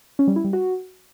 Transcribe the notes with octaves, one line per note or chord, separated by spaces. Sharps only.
C#4
G3
E4
G3
F#4